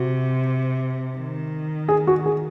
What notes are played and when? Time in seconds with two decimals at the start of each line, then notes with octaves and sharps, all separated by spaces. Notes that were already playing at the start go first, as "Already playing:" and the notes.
Already playing: C3 F#4
1.17 D#3
1.89 G#4
2.07 F#4
2.26 G#4